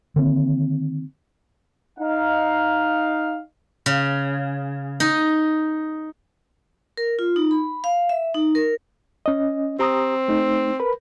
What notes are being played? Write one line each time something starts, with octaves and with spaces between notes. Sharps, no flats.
D3 D#3 A#3 C4
D#4 F5
C#3
D#4
A#4
F4
D#4
B5
F5
E5
D#4
A#4
C#4 D#5
C4 G4 A#5 D#6
A3 D#4
A#4 B4 B5